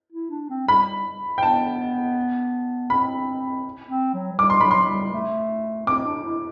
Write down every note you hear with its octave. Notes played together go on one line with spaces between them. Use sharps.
E4
D4
C4
G3 B5
G5
B3 A5
C4 B5
C4
F#3
F#3
G3 D6
C6
F#3 B5
C6
G3
A3
C4 D6
D4
E4